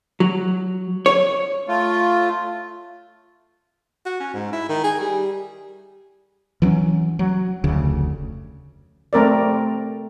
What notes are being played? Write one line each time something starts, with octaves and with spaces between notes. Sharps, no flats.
F#3
C#5
A3 F4
F#4
C#4
G#2
E4
D#3
G#4
G3
E3 F#3 G#3 C#4
F#3
F1 D2 C#3
A3 C4 A#4 D5